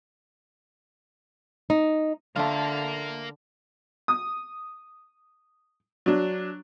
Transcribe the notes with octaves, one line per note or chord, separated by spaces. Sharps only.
D#4
D3 A3 F4 A#4 F5
D#6
F#3 D4